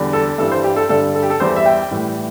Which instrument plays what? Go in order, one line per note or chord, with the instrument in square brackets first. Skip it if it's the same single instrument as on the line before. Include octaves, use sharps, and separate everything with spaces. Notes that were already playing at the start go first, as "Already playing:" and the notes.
Already playing: [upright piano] E2 D3 G3
A4
G2 E3 G3 A4
C5
G4
A4
G2 D3 G3 A4
A4
G4
A4
E2 E3 G3 C5
E5
G5
A2 E3 G3